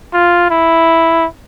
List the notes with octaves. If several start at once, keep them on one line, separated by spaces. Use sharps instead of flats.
F4
E4